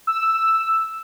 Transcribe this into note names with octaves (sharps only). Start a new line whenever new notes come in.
E6